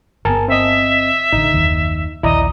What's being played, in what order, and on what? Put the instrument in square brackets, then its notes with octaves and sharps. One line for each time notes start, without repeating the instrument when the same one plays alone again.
[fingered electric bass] G1 B3 [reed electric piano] A#4 G#5 A5
[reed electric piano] C4 D#5 [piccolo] E5
[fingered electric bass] A1 D3 [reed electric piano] D#4
[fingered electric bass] F#1 D#2
[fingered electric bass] A#1 D#2 [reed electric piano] E4 D5 A#5 [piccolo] D#5